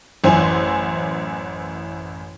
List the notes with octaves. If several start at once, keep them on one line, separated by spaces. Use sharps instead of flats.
A1 F#2 E3 E4 C5 G#5